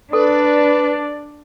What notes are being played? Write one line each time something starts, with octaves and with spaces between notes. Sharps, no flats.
D4 A4 B4 D5